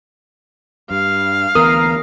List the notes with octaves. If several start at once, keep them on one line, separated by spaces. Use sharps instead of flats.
G2 F5
D2 E3 B3 A#4 D#6 C7